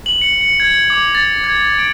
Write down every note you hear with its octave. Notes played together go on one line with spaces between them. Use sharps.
F#7
C#7
C#7
G#6
D6
A6
G#6
D7